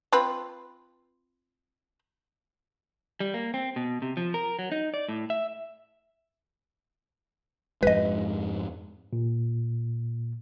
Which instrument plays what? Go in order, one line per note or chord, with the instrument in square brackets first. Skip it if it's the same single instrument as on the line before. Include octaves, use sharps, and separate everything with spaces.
[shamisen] C4 F4 B4
[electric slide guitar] G3
A#3
C4
B2
C3
F3
A#4
F#3
D#4
D5
A2
E5
[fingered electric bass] F2 G#2 G#3 [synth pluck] B4 D#5
[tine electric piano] A#2